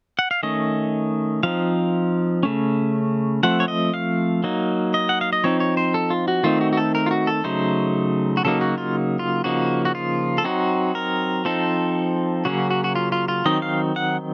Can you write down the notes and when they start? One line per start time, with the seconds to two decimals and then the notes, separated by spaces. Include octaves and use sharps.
0.19 F#5
0.31 F5
0.43 D#3 A3 C#4 D#5
1.43 F3 C4 D#4 F5
2.43 C#3 A3 C#4
3.43 F3 A3 C4 F#5
3.60 C#5
3.68 D#5
3.94 F5
4.44 F#3 A#3 D#4
4.94 D#5
5.09 F#5
5.21 F5
5.33 D#5
5.44 F3 C4 D#4 C#5
5.60 C#5
5.77 C5
5.94 A4
6.10 F4
6.28 F#4
6.43 D#3 A3 C4 D#4 F4
6.61 F#4
6.73 F#4
6.77 A4
6.95 A#4
7.06 F4
7.11 F#4
7.27 A4
7.44 C#3 F#3 A3 D#4 C5
8.37 F#4
8.45 C#3 F#3 A#3 D#4 A4
8.61 F#4
8.78 F4
9.19 F4
9.44 C#3 F3 A#3 D#4 F#4
9.85 F#4
9.95 F4
10.38 A4
10.44 F#3 C4 D#4 F#4
10.95 A#4
11.45 F3 C4 D#4 A4
12.45 C#3 F#3 A#3 C#4 F#4
12.71 F#4
12.84 F#4
12.95 F4
13.12 F4
13.28 F4
13.45 D#3 F#3 C4 D#4 D#5
13.62 F5
13.96 F#5